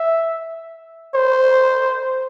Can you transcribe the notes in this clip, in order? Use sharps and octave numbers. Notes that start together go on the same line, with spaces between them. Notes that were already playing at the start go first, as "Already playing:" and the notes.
Already playing: E5
C5